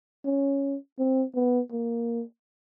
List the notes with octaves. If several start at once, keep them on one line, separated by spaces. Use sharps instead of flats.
C#4
C4
B3
A#3